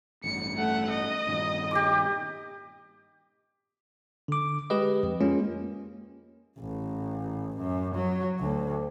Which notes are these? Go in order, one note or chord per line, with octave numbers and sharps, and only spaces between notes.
A1 G2 C#7
A3 F#5
D#5
G2 A#2 D#3
G4 D#5 D6
D3 D6
G#3 G4 B4 D#5
F2
G#3 A#3 C#4 F4
A1
F#2
F#3
D2